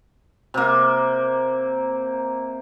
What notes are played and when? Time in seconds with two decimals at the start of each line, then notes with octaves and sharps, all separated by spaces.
0.54 C3 A#3